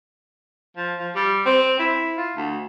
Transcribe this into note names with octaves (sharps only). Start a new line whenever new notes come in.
F3
F3
G3
C4
E4
F4
D2